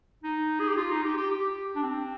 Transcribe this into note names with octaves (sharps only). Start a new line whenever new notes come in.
D#4
G#4
G4
F4
D#4
G4
G4
G4
D4
C4